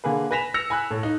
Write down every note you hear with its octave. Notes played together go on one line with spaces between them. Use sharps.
D3 A#3 G#4 B4
B4 G#5 A#6 B6 E7 F7
E6 A#6 C#7 E7 F7
G#5 B5 E6 F#6
A2
D#4